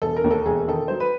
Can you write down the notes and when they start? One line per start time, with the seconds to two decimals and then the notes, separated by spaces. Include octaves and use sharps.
0.02 E1 A4
0.16 A#4
0.24 D#2
0.31 A4
0.46 E1 G#4
0.68 D#3 A4
0.88 F#3 C5
1.00 B4